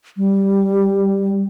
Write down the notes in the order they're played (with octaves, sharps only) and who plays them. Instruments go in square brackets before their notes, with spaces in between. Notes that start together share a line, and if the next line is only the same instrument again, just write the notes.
[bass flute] G3